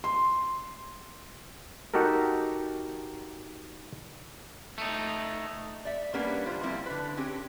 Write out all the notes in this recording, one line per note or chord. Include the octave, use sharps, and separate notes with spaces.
C6
D#4 F#4 G4 A4 A#4
A3 D#4
D5 E5
G3 A#3 B3 C#4 D4
D3 G3 F4 C5
F3 G3 A#3 C4 E4
D3 B4
C4 C#4 G4 G#4